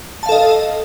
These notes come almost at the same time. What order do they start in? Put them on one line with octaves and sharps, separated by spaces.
A5 F5 A4 D#5